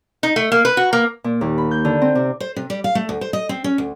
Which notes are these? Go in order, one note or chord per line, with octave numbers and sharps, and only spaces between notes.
D#4
A3
A#3
B4
F#4
A#3
A#2
D#2
B5
G6
D3
C4
C3
C5
C3
G3
F5
A3
D2
C5
D#5
C4
C#4
D2